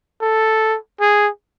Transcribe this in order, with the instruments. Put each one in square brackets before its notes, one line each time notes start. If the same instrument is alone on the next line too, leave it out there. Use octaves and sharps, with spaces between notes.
[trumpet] A4
G#4